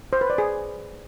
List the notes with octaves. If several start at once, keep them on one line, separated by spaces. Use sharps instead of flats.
C5
B4
D5
G#4